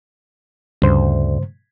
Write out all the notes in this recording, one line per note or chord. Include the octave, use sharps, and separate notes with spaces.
D2 G2 C#3 C5